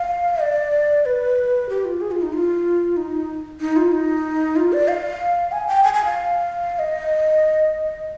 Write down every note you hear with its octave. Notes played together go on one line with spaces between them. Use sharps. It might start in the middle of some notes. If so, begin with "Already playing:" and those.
Already playing: F5
D5
B4
G4
F4
G#4
F4
D#4
F4
D#4
D#4
F4
D#4
F4
D5
F5
G#5
G5
G#5
G#5
F5
D#5